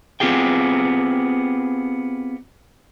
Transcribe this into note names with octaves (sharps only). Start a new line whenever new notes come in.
B3 C4 F4 G4 G#4 G5